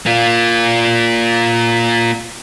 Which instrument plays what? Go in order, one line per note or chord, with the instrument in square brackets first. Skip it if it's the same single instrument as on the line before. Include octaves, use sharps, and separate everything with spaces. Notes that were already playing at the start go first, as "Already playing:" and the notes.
[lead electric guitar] A#3 F4